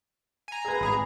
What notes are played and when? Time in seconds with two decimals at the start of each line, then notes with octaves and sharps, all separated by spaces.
0.48 G#5 A#5
0.65 G#4 B4
0.81 G#1 G#4 A#5 B5